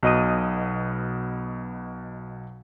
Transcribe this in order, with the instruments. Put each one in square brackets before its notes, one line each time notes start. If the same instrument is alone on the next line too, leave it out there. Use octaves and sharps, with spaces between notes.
[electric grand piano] B1 B2 D#5 D#6 D#7